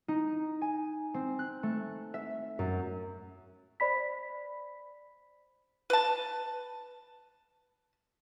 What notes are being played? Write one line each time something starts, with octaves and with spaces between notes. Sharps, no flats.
D#4
G#5
C4
F#6
A3
E5
F#2
C5 D5 B5 B6
B4 A5